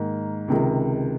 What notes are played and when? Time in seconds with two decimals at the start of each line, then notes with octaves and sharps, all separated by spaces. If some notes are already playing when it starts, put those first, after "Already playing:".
Already playing: G#2 D#3 A#3
0.48 C#2 C3 D#3 G#3